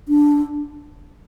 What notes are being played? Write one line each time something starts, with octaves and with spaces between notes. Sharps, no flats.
D4